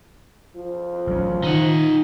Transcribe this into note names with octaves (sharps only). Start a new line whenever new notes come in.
F3
A1 F#3 C#4
D#3 D#4 F#5